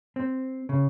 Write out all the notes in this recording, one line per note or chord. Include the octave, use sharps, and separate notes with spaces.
C4
C#3